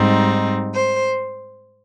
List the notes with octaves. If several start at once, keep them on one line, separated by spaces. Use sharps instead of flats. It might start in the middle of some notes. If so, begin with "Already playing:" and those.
Already playing: G#2 G3 C4 D#4
C5